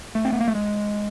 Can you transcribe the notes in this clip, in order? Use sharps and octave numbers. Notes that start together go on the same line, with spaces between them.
A3
C4
B3
A#3
A3
G#3